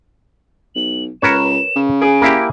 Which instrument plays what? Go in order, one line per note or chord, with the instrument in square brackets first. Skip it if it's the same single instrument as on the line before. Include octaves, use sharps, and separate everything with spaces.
[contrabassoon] B1 [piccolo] F#7
[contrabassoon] C#2 [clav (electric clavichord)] A#4 B4 C#5 [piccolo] E7
[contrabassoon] C#3
[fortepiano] G#4 [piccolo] D7
[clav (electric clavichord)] A#3 E4 G4